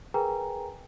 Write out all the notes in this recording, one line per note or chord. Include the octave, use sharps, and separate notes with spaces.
G#4 A#4 B4 G5 G#5 A#5